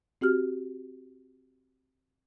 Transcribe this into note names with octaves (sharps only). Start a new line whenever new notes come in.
C4 F#4 G4 F6